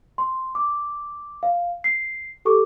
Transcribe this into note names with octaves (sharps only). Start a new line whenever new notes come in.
C6
D6
F5
C7
G4 A4 C#6 D6